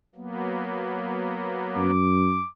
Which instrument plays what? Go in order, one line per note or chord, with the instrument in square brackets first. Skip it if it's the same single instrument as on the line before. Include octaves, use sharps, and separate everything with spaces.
[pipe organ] F#3 A#3 B3
[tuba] F#2 [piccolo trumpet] D6